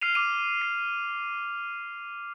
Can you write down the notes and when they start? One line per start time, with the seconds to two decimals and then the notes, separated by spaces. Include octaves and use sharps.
0.01 F6 C7 D#7 F7
0.14 D6 D#7 F7
0.62 C7